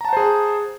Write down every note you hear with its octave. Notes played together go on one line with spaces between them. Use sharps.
G#4 C5 F#5 A5 A#5